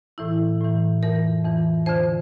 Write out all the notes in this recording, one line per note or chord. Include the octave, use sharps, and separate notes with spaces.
A2 E3 E4
A2 E3
F2 E3 A#4
F2 E3
F2 D3 C5